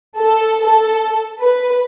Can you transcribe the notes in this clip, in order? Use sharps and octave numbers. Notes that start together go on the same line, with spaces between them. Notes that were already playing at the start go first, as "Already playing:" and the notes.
A4
A4
B4